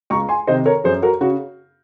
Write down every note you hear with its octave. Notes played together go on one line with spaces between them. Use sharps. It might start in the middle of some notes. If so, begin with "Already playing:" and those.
C#2 A#5 C#6
G#5 C6
C3 D#3 C5 D#5
A#4 C#5
F#2 G#4 C5
F#4 A#4
C#3 F#4